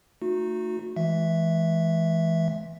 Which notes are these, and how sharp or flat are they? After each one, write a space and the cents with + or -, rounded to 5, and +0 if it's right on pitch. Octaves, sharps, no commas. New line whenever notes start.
A3 +20 D#4 +0 F#4 -30
E3 +0 G#3 +35 E5 +0